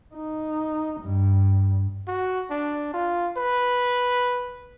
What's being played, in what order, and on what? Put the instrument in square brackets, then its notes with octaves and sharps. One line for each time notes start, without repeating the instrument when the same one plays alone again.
[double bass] D#4
G2
[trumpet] F#4
D4
F4
B4